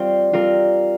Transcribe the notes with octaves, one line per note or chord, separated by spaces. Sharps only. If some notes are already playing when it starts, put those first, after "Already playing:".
Already playing: G3 C4 F4 C5
G3 C4 F4 A#4